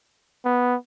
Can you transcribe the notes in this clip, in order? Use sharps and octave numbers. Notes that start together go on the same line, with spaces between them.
B3